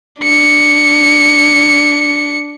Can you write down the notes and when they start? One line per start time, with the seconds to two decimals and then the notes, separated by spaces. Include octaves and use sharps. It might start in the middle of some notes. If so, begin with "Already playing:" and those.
0.21 D4 C#7